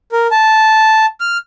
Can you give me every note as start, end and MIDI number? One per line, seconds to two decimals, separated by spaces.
0.12 0.27 70
0.31 1.06 81
1.20 1.38 89